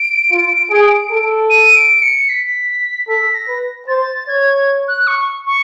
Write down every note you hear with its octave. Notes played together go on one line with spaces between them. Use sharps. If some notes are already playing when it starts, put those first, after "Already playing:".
Already playing: D7
F4
G#4
A4
D#7
D7
C#7
B6
A4 B6
A#6
B4
C5 A6
C#5 G#6
F#6
C#6
C#6